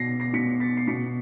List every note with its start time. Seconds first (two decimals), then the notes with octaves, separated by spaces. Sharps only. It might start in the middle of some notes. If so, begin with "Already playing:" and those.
Already playing: B2 A#6 C7
0.20 A#6 C7
0.33 B2 B6 C#7
0.60 A6 B6
0.77 C7
0.88 B2 B6 C#7